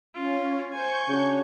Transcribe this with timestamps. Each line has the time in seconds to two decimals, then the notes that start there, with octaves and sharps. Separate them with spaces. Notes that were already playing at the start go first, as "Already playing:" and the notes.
0.15 C#4 F4
0.72 C5 G#5 C#6 G6
1.09 C#3 D4 F#4 C#5